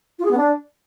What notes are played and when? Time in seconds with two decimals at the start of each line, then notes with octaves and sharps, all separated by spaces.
0.18 F4
0.25 G#4
0.31 B3
0.37 D4